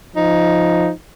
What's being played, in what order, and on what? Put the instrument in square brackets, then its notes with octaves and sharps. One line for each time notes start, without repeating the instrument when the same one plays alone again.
[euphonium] F3 [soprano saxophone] D#4